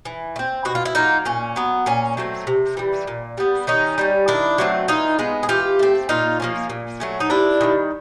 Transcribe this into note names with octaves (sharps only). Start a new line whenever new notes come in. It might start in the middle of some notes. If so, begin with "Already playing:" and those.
E3
A3
C4
B2 F#4
F4
E4
F#3 A#3 D#4 F4
A#2 C#4
F#3 B3
A#2 C#4
F#3 A3 C4
C3
E3 G3
A#2
G3 B3
D#3 C#4 D#4
G3 A#3 C#4
D#3 D4 E4
F#3 A3 C4
E3 D#4 F4
G#3 B3
G#4
E3 F4 G4
A3 C4
A#2 D#4 F4
F3 A#3 C#4
A#2
F#3 A3 C#4
D#4
C3 D4 E4
D#3 G3